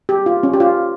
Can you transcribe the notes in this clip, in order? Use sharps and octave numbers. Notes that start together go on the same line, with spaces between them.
G4
F4
C#4
G4
F4